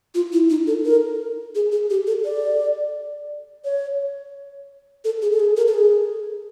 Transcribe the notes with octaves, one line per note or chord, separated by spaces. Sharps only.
F4
E4
D#4
A4
A#4
G#4
G#4
G4
A4
D5
C#5
A4
G#4
A4
G#4
A#4
A4
G#4